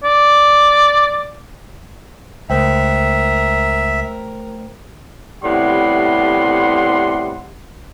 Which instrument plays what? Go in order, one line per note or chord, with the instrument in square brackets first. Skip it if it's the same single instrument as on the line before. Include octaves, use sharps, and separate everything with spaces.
[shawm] D5
[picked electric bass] C#2 [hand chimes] A3 C5 G5 [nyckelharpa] A#4 [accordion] E5
[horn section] A2 C3 G3 B3 F#5 C6